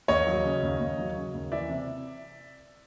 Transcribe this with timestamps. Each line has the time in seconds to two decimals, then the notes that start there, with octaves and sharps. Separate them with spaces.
0.08 D#2 C#5 D#5
0.27 F#3
0.44 C#3
0.63 D#2
0.80 D#2
0.98 F#3
1.17 C#3
1.34 D#2
1.52 E3 D5 E5
1.70 C3